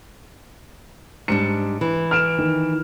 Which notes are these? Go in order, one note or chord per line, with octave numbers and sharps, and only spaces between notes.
G#2 G3 D4 C#7
E3
F6 D7 E7
D#3